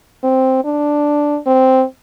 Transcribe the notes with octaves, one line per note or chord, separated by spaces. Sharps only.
C4
D4
C4